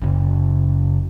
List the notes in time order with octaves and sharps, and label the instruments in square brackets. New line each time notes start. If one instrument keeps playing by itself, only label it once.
[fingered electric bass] F#1 C#3